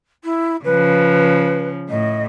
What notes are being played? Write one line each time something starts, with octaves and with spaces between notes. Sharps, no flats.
E4
C#3 F3 B4
A2 D#5